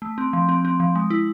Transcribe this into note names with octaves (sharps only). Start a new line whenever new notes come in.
A3
C4
F3
C4
C4
F3
G#3
E4